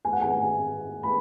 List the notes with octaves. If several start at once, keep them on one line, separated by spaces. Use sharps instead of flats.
G#5
F#5
G#5
B5